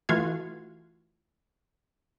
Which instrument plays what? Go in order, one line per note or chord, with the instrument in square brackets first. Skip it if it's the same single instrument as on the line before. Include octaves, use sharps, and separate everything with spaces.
[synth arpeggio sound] E3 A3 F4 F#4 F5 G#6